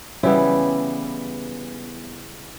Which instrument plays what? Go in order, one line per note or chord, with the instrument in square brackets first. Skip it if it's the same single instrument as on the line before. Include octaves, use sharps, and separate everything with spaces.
[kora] C#3 E3 G3 B3 E4